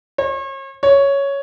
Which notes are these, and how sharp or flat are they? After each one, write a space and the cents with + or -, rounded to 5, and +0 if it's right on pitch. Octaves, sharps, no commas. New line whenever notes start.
C#5 -40
C#5 +5